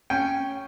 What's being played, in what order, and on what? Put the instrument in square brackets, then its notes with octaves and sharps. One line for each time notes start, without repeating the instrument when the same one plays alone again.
[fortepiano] C#4 G5